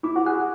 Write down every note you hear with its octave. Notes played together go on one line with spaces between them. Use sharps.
E4 D6
F#4
G#4 F#6
G#4